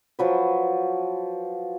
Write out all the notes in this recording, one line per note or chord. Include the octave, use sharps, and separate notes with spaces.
F3 F#3 B4